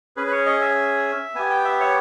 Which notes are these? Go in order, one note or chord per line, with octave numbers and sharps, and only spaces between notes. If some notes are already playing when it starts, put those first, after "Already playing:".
C#4 G#4 B4
B4
C#5
D#5
E5
B3 G4 G#5
G5
E5
C#5